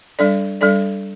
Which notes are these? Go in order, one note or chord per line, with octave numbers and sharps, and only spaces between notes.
G3 D4 A4 D5
G3 D4 A4 D5